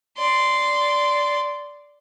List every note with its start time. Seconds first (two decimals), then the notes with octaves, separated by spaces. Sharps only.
0.17 D5 C6